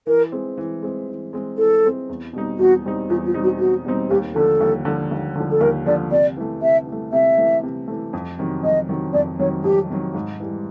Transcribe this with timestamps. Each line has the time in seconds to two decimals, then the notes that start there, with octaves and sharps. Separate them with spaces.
0.07 E3 A#4
0.32 G#3 C4
0.57 E3
0.83 G#3 C4
1.08 E3
1.33 G#3 C4
1.58 E3 A4
1.84 G#3 C4
2.09 E2
2.33 B2 G3 C4 D#4
2.58 E2 F#4
2.84 B2 G3 C4 D#4
3.09 E2 F4
3.26 F4
3.34 B2 G3 C4 D#4
3.44 F#4
3.59 E2 F#4
3.85 B2 G3 C4 D#4
4.10 D#2 G4
4.35 D3 F3 A4
4.61 D#2
4.85 D3 F3
5.11 D#2
5.36 D3 F3
5.51 A4
5.61 D#2 A#4
5.86 D3 F3 D5
6.11 C3 D5
6.37 E3 A3
6.61 C3 E5
6.87 E3
6.92 A3
7.12 C3 E5
7.38 E3 A3
7.63 C3
7.88 E3 A3
8.13 F2
8.39 C3 D#3 F#3
8.63 F2 D#5
8.89 C3 D#3 F#3
9.13 F2 D5
9.39 C3 D#3 F#3 C#5
9.64 F2 G4
9.90 C3 D#3 F#3
10.15 G#2
10.40 E3 G3